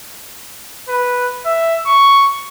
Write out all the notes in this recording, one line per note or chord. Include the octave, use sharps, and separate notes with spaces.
B4
E5
C#6